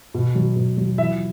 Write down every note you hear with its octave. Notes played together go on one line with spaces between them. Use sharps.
B2
F#3
B2
F#3
E3 E5